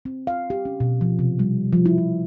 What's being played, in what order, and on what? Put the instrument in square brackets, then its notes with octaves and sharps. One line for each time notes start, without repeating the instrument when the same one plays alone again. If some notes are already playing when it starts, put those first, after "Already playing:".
[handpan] C4
F5
G4
C#4
B2
F3
C3
G3
F3
E4
F3